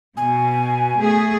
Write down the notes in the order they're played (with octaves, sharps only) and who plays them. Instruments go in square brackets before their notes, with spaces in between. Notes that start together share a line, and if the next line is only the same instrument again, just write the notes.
[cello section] B2 [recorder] G#5
[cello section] A3 G#4